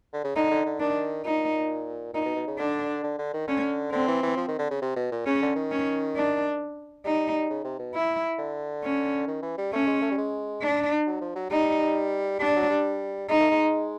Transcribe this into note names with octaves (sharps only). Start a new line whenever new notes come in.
D3
C#3
D3 D#4
D3
D3
D#3 D4
A#2 D#4
A#2 D#4
B2
B2
C#3
D3 D4
D3
D3
D#3
D3 C#4
D3 C4
E3
E3
F3
D#3
D3
C#3
C3
B2
A#2
C#3 C#4
D3
D#3
C#4
D4
G3 D#4
C#3
C3
B2
E4
D3
C#4
D#3
E3
G3
A3 C#4
G#3
A3
G3
G#3
D4
F#3
F3
F#3
G3 D#4
G3 D4
F#3
G3
G#3 D#4
A3
G#3